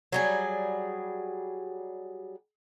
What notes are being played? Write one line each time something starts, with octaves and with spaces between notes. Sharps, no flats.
F#3 G3 G#4